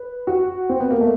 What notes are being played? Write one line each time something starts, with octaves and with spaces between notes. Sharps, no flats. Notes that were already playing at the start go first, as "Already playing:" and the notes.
Already playing: B4
F#4
C4
B3
A#3
A3